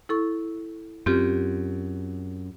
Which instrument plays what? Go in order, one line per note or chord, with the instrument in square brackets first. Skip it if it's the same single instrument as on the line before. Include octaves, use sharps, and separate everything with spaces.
[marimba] E4 A4 C#6
[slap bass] F#2 [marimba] C4 F4 G4